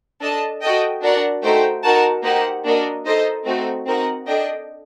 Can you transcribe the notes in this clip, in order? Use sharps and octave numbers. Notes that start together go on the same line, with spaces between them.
D4 A4 D#5 A5
F#4 A4 D#5 G5
D4 F#4 A#4 D5 F#5
A3 D#4 F#4 C5 G5
D#4 F#4 A#4 F#5 A5
A#3 D#4 G4 C5 F#5
A#3 D4 F#4 A#4 D#5
D#4 A4 C5 D#5
A3 C4 D#4 F#4
C4 D#4 F#4 A#4 F#5
D4 A4 D#5 G5